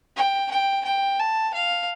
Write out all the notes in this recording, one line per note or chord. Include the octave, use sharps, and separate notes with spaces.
G5
G5
G5
A5
F5